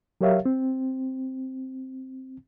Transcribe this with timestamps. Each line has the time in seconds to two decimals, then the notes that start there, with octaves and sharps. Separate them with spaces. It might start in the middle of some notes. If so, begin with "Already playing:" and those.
0.21 F#3 G4 A#4 C#5 E5 F5
0.46 C4